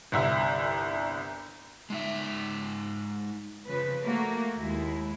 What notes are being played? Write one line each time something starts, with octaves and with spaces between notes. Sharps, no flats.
G1 C2 E5
G#3 D#4 E5
C#3 F3 B4
A3 A#3 F#4
D#2 G#3 E4